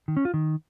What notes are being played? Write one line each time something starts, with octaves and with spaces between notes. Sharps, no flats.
D#3
C#4
F4
D#3